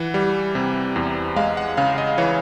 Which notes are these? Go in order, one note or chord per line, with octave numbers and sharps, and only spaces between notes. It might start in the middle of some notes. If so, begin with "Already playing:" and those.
Already playing: E3 F#5
G3
C3
E2
G#3 F5
F#5
C#3 F5
D#5
E3 C#5